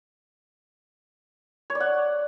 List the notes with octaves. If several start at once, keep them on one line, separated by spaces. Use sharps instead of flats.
C#5
D5
F#5